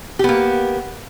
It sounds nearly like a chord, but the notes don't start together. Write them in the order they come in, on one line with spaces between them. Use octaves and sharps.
G4 B3 A#3